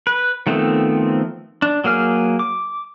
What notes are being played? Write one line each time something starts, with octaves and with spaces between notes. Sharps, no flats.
B4
D#3 F3 A3 B3 C4
D4
F#3 A#3 G#4 F6
D6